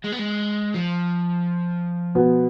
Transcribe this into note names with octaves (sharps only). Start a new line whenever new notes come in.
G#3
B3
G#3
F3
B2 B3